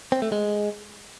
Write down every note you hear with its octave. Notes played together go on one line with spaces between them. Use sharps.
C4
A3
G#3